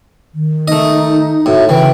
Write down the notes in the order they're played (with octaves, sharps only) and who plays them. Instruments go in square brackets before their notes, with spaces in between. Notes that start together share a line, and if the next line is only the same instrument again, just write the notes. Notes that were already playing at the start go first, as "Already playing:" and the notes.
[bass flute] D#3
[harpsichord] A3 D#5 [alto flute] D#4
[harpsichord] A2 [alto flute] F#4 [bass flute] E5
[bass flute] C#3 [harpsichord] E3 [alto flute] G5